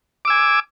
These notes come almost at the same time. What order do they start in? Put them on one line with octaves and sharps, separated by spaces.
D6 E6 G#5